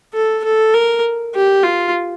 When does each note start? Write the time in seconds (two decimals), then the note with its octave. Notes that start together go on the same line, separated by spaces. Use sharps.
0.14 A4
0.44 A4
0.74 A#4
1.34 G4
1.63 F4